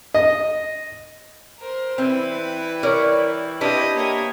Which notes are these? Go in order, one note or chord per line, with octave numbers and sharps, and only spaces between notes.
D#5
A#4 C5
E3 G3 C4 E4 B4
A#4 C#5 D5
C4 D4 E4 G4 B4 D#5
A#3 E4 C#5 D#5